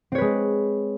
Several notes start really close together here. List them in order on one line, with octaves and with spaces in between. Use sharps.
C4 C#5 B4 G#3